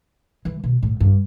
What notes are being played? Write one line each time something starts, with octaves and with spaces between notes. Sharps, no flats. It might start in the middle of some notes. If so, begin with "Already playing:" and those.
E3
B2
A2
G2